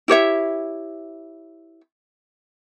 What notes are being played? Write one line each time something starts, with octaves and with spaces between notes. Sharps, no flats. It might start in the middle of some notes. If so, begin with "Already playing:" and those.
E4 G4 C#5 E5